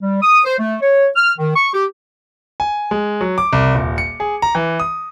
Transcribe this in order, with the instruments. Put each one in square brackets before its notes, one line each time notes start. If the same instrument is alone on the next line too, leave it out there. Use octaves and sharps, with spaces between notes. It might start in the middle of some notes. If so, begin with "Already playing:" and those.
[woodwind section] G3
D#6
C5
A3
C#5
F6
D#3
C#6
G4
[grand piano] G#5
G#3
F#3
D6
C2
D#1
C#7
G#4
A#5
E3
D#6